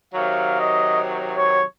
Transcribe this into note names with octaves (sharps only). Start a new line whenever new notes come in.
C3 D#3 F#3 F5
D#5
C#5